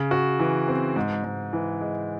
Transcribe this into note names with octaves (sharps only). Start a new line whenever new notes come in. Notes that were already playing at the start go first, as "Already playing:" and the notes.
Already playing: C#3
F#4
E3
C4
G#2
G#2
E3
G#3